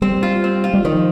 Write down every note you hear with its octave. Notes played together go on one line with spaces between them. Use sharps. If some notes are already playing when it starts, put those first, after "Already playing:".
G3 C4
F4
C4
F4
G3
D#3 F3